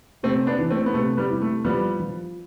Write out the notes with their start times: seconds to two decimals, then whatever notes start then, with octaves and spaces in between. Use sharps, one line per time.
0.23 C3 A3 C4
0.47 B3 D4
0.58 E3
0.71 A3 C4
0.86 B3
0.94 C3 A3
1.17 G3 B3
1.30 E4
1.42 A3
1.65 F3 G3 B3
1.99 F3